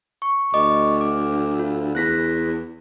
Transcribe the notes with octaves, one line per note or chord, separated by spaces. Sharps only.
C#6
D2 D#5 C#6 D6
D6
F4
E2 F#6 A#6 B6